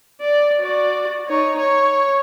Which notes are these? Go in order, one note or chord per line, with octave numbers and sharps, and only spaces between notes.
D5
F#4 D5
D#4 C#5
C#5